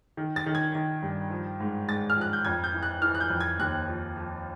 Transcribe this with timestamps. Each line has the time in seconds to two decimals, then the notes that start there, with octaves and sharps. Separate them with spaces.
0.17 D#3
0.36 A6
0.46 D#3
0.55 G#6
0.75 D#3
1.02 G2
1.31 F3
1.60 G#2
1.88 G#2 A6
2.10 F6
2.16 F3 F#6
2.33 G6
2.45 F2 G#6
2.64 G6
2.73 E3
2.83 F#6
3.02 E3 F6
3.15 F#6
3.20 G6
3.30 F2
3.40 G#6
3.59 D#2 F#6
3.88 F3
4.16 F3